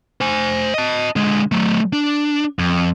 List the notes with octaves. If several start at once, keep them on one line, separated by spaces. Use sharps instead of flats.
C5 G#5
D#5 A5
D3 G#3
F#3 A3
D4
F2